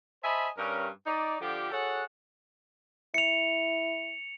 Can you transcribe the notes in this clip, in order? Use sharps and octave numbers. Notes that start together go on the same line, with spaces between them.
C5 D#5 E5 G#5 A5 B5
G2 C#4 A#4
D#4 D5
D3 F3 G4
F#4 G#4 A4 C#5 F#5
E4 C#7 F7